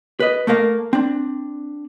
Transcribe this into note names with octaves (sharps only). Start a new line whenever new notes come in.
B4 D#5
A3 A#3 A#4 F5
C4 D4